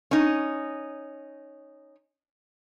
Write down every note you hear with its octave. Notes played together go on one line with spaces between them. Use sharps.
C#4 D#4